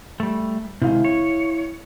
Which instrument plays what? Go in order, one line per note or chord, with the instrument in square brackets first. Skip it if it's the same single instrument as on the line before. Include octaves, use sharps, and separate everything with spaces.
[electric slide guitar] G3 A3
[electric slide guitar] C3 D#3 G#3 [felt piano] E4 F5
[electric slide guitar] C#5